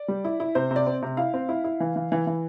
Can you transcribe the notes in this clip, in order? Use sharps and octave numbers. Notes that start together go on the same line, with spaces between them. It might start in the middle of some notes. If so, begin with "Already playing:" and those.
Already playing: D5
G3
E4
E4
C3 C5
C3
D5
C4
C3
E4 F5
C4
E4
E4
E3
E3
E3
E3